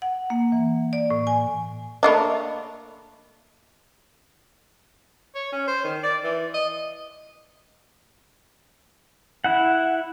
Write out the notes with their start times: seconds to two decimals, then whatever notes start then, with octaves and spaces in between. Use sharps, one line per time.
0.02 F#5
0.30 A#3
0.52 E3
0.93 D5
1.10 A2
1.27 G#5
2.03 A3 A#3 D4 D#5 B5
5.35 C#5
5.53 C#4
5.68 C5
5.85 D#3
6.04 D5
6.24 E3
6.54 D#5
9.44 E4 F#5